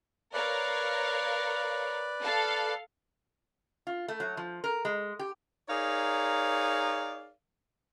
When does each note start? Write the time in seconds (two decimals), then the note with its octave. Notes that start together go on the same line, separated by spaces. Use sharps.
0.34 A#4 B4 C#5 D5 F5
2.23 A4 F5 A5
3.87 F4
4.08 A3
4.20 F#3
4.37 F3
4.64 A#4
4.85 G#3
5.19 G4
5.68 D#4 G#4 A#4 C#5 D5 F5